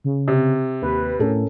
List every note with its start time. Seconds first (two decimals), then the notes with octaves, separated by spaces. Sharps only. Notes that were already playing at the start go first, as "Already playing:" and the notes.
0.04 C#3
0.28 C3
0.82 D#2 B4
1.20 A2 C#4 A4 A#4